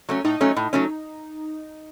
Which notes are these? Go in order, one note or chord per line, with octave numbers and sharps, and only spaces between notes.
F#3 A3 C#4
A2 D#4
F#3 A3 C#4
A2
F#3 A3 C#4